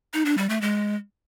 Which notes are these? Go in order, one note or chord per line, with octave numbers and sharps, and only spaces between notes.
D#4
D4
G3
A3
G#3